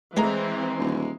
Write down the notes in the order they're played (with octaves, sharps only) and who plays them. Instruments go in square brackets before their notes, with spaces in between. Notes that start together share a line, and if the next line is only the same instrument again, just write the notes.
[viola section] E3 C4 [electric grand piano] G#3 A#5 [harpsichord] A3 B3
[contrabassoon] D#1